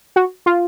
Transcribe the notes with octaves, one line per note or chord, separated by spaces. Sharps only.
F#4
F4